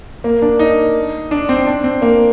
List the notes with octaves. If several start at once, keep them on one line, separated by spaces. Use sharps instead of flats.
A#3
D4
D#4
D4
C4
D4
C4
A#3